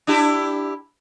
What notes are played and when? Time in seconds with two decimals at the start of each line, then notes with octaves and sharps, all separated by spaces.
0.07 D4 E4 G4